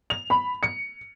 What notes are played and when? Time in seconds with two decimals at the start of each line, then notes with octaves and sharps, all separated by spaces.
0.10 F7
0.30 B5
0.63 C#7